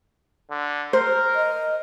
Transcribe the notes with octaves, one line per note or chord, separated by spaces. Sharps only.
D3
A#4 C5
D#5